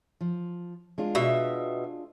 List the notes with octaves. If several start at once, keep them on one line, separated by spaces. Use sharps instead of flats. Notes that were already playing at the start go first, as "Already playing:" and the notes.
F3
G#3 D4 F4
B2 E5